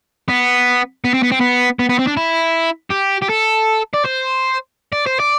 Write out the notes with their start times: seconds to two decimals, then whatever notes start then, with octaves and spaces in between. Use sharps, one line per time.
0.29 B3
1.04 B3
1.14 C4
1.23 B3
1.32 C4
1.41 B3
1.79 B3
1.89 B3
1.99 C4
2.07 D4
2.17 E4
2.91 G4
3.22 G4
3.30 A4
3.94 D5
4.05 C5
4.93 D5
5.06 C5
5.19 D5